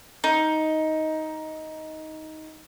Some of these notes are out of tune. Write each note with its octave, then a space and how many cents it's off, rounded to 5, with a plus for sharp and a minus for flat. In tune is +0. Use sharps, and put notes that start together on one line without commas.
D#4 +10